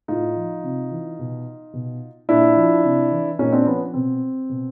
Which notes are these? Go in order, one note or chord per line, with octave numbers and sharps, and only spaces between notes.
A2 D#4 F4
F3
C3
E3
B2
B2
A#2 D4 E4
F3
C3
E3
A#2 C#4 D#4
C4 D4
F3 B3 C#4
B2 C4
B2